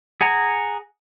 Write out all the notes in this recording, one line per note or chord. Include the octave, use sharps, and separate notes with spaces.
G#4 F#5 G#5 A#5